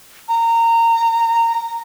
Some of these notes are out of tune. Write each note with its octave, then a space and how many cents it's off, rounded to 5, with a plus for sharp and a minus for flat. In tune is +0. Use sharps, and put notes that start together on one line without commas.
A#5 -20